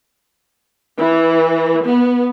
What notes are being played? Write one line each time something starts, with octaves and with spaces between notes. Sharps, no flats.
E3
B3